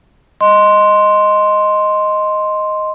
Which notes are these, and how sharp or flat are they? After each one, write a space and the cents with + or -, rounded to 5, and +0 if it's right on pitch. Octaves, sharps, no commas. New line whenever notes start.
D#5 +0 C6 +0